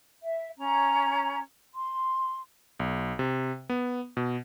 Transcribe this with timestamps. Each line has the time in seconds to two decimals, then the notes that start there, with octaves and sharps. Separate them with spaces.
0.23 E5
0.57 C#4 A#5
1.73 C6
2.80 B1
3.19 C3
3.69 B3
4.17 B2